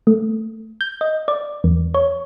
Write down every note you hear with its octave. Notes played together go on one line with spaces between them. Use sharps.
A3
G6
D#5
D5
E2
C#5